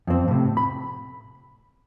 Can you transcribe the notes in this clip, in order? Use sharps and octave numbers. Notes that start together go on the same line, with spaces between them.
F2 C4
A2 C3
B5